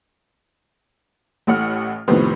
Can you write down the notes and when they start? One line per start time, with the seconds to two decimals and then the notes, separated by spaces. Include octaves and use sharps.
1.47 A1 A2 F#5 F6
2.08 F2 A2 C3 D#3 B3